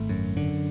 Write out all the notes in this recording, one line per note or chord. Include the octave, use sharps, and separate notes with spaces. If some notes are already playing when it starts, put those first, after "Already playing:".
Already playing: G#1 A3
F#2
D3